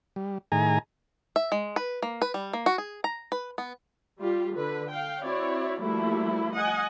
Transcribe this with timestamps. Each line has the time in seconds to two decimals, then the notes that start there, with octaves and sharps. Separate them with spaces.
0.16 G3
0.52 A2 D#3 G#4 G#5 A#5
1.36 E5
1.52 G#3
1.76 B4
2.02 A#3
2.22 B4
2.34 G3
2.53 A#3
2.66 F#4
2.78 G#4
3.04 A#5
3.32 B4
3.58 B3
4.20 G3 F4 G4
4.55 D3 B4
4.90 F5 G5
5.23 C4 E4 F#4 C#5 D5
5.80 F3 G3 A3 A#3 E4 F#4
6.55 D#5 F#5 G#5